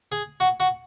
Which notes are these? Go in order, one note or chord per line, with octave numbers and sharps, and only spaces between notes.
G#4
F#4
F#4